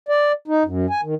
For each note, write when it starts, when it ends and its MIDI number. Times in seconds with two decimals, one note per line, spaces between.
0.09 0.32 74
0.48 0.63 63
0.65 0.86 42
0.90 1.01 80
1.03 1.15 51